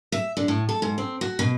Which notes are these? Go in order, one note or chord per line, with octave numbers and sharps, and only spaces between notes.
E5
D3
A2
A4
G#2
C4
F#4
B2